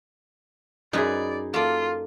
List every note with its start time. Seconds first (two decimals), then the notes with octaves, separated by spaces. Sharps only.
0.93 F#2 D#4 G#4 B4 D5 G#5
1.54 A#3 F4 A4 D5